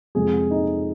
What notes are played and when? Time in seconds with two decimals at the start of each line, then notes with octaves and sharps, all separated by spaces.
0.15 F2 C3 G#3 G#4
0.50 D#4 D#5